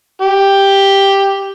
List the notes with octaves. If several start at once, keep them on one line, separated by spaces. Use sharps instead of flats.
G4